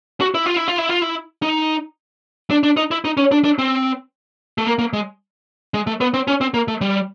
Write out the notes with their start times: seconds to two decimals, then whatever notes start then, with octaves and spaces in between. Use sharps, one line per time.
0.21 F#4
0.34 E4
0.46 F4
0.56 E4
0.68 F4
0.78 E4
0.89 F4
1.02 E4
1.42 D#4
2.51 D4
2.63 D4
2.77 D#4
2.91 E4
3.05 D#4
3.17 C#4
3.32 D4
3.44 D4
3.59 C4
4.58 A3
4.66 A#3
4.79 A#3
4.93 G#3
5.74 G#3
5.87 A3
6.01 B3
6.14 C4
6.28 C#4
6.41 C4
6.54 A#3
6.68 A3
6.81 G3